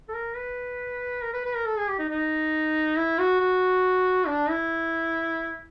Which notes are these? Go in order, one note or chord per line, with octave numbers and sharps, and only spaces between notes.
A4
A#4
B4
A#4
B4
B4
A#4
A4
G#4
G4
D#4
D#4
E4
F#4
F#4
D4
E4